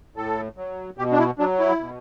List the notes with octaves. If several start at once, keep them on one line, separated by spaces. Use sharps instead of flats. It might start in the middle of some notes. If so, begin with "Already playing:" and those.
A2 A4
F#3
B2 G4
D4
E4
F#3 D4
E4
B2